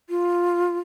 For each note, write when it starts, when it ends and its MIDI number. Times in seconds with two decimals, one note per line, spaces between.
0.10 0.78 65